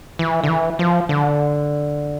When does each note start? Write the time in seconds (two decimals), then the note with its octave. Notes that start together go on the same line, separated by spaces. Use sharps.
0.19 E3
0.43 D3
0.49 E3
0.79 F3
1.09 D3